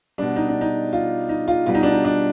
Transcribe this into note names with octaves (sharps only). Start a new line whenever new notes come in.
B2 G3 D4
D#4
D4
D#4
F4
D#4
F4
B2 G3 F4
D#4
D4
D#4
D4